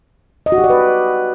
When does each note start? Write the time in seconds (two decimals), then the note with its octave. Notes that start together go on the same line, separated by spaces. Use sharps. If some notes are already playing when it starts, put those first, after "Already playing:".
0.46 D#5
0.52 F#4
0.58 G4
0.64 D5
0.70 B4